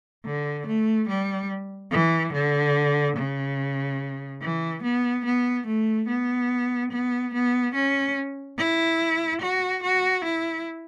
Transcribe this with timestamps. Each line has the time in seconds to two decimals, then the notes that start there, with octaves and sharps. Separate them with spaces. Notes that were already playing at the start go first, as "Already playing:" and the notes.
0.25 D3
0.67 A3
1.09 G3
1.92 E3
2.33 D3
3.17 C#3
4.42 E3
4.83 B3
5.25 B3
5.67 A3
6.08 B3
6.91 B3
7.34 B3
7.75 C#4
8.58 E4
9.41 F#4
9.83 F#4
10.25 E4